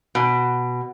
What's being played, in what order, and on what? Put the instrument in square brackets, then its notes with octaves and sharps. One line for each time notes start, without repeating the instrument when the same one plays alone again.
[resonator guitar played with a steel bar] B2